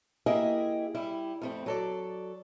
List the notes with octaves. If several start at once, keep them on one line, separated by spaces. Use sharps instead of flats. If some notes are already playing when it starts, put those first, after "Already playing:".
A#3 E4 G4 G#4 D#5 E5
G3 E4
F2 A3 C4
F#3 A4 D5